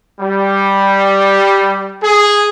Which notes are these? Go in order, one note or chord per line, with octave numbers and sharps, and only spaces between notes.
G3
G#4